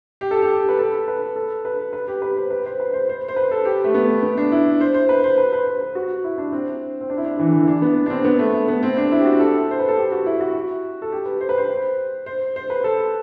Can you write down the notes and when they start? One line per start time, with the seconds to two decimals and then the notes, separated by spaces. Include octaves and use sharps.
0.21 G4
0.31 A4
0.42 G4
0.69 B4
0.79 A4
1.08 B4
1.36 A4
1.65 B4
1.93 B4
2.08 G4
2.22 B4
2.36 C5
2.51 B4
2.66 C5
2.80 B4
2.93 C5
3.09 C5
3.28 C5
3.36 B4
3.51 A4
3.65 G4
3.84 A3
3.94 B3
4.23 B3
4.37 D4
4.52 E4
4.81 C5
4.94 C5
5.09 B4
5.24 C5
5.38 B4
5.53 B4
5.67 C5
5.81 B4
5.95 F#4
6.24 E4
6.38 D4
6.52 C4
7.01 C4
7.09 D4
7.17 E4
7.24 D4
7.39 E3
7.46 D3
7.53 E3
7.62 E4
7.67 D4
7.82 B3
8.06 D4
8.10 C4
8.25 B3
8.39 A3
8.53 A3
8.68 B3
8.83 C4
8.97 D4
9.12 E4
9.20 G4
9.25 F#4
9.40 A4
9.71 C5
9.79 B4
9.88 A4
9.97 G4
10.12 F#4
10.26 E4
10.41 F#4
11.02 A4
11.12 G4
11.26 B4
11.41 C5
11.49 B4
11.58 C5
12.26 C5
12.56 C5
12.70 B4
12.84 A4